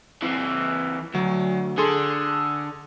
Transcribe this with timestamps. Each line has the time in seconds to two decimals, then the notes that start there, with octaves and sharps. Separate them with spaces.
0.22 E3 C4
1.15 D2 F#3
1.78 D3 G#4 A4 C6